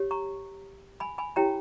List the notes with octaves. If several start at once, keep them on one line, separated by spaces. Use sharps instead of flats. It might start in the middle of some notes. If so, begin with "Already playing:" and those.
Already playing: G4 C#5
A#5 C#6
G#5 B5
G#5 B5
E4 G4 C#5 G5 A#5